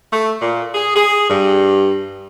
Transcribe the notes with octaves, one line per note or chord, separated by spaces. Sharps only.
A3
A#2
G#4
G#4
G2